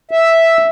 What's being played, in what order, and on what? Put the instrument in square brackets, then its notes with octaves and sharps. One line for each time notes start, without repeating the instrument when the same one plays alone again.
[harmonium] E5